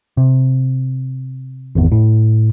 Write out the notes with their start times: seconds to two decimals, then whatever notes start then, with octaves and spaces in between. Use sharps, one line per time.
0.17 C3
1.75 G#1 E2
1.92 A2